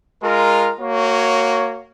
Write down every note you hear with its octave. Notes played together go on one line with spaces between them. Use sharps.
G#3 F4 A#4
A#3 F#4 C#5